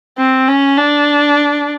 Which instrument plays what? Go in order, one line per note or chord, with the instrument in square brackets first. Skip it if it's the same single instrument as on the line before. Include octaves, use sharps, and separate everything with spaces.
[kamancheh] C4
C#4
D4